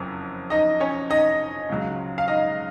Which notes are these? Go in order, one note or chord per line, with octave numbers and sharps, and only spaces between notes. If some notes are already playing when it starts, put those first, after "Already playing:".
Already playing: F#1 F2 F#3
D#4 D#5
C#4 C#5
D#4 D#5
C#2 C#3 F#3
F5
D#4 D#5